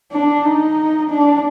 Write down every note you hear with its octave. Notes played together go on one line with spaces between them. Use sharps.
D4
D#4
D4